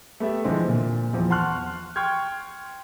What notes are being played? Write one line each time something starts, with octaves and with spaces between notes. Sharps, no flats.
A3 B3 G4 E5
D3 E3 F3 G#3 C4 D4
A#2
E2 E3 F3 C4
F#5 A5 C6 C#6 F6 F#6
G5 C6 C#6 F6 G6 G#6